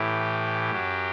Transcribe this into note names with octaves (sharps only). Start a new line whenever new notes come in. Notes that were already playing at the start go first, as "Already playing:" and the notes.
Already playing: A2 E3 G4
F#2 F#3